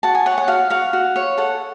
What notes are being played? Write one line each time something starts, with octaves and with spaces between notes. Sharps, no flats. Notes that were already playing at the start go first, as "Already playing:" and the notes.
F#4 A5
G#5
C#5 F#5
F#5
F#4 F5
F#4 F5
F#4
C#5
A4 F#5